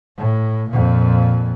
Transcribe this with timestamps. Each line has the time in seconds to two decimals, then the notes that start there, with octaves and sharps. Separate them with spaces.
0.18 A2
0.71 F2 A#2